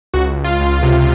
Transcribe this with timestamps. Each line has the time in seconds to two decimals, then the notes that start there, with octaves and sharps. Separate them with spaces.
0.14 C#2 F#4
0.37 C#2
0.44 F4
0.60 C#2
0.75 F4
0.83 C3